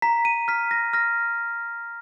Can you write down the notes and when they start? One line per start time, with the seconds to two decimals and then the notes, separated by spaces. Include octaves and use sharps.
0.02 A#5 B6
0.25 D#7
0.48 F6 B6
0.71 A#6
0.93 F6 A#6